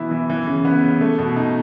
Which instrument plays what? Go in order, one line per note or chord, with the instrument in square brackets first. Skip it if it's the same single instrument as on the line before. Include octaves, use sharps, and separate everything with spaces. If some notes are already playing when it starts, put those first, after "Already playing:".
Already playing: [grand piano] B2 E3 B3 E4
E3
E3
C#3
B3
C#3
A3
B2
D#4